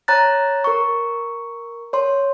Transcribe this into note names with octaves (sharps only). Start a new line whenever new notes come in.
C#5 A#5 F#6 A6
A#4 C#6
C#5 C6